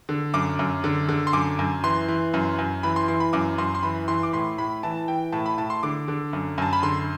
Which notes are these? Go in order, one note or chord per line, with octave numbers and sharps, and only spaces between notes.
D3
F#2 D6
F#2
D3
D3
C6
F#2 D6
F#2
E3 C6
E3
F#2
F#2
E3 B5
C6
E3 C6
B5
F#2 D6
F#2 C6
C6
E3 B5
E3 C6
D6
A2 C6
A2 B5
E3 A5
E3 G5
A2 A5
B5
A2 A5
C6
D3 D6
D3
F#2
F#2 A5
B5
D3 C6